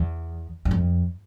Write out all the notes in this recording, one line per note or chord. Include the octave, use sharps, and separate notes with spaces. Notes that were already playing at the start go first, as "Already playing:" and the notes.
Already playing: E2
G2
F2